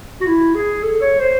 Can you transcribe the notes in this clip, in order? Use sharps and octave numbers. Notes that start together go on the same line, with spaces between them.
F#4
E4
G#4
A4
C#5
C5